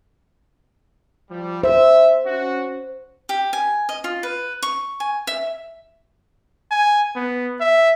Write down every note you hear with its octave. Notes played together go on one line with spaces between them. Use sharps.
F3 G3
C5 E5
C#4 F#4
G4
G#5
D#5
F4
B4
C#6
G#5
E5
G#5
B3
E5